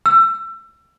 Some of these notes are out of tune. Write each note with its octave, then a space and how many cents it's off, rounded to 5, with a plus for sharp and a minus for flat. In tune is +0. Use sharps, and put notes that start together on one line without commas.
E6 +25